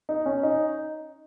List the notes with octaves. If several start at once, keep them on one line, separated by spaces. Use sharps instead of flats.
D#4
C#4
D#4